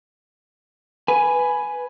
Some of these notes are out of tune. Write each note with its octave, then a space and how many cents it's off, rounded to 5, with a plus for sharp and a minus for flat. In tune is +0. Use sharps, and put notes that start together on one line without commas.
B4 +0 G#5 +5